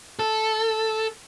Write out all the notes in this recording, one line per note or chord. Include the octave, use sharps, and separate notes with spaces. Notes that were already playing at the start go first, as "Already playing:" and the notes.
A4